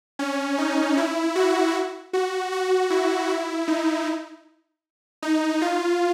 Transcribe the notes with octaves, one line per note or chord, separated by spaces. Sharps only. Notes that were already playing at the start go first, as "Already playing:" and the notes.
C#4
D#4
E4
F#4
F#4
F#4
E4
E4
D#4
D#4
F4